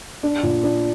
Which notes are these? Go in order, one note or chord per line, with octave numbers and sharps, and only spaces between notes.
D4
A#2
D4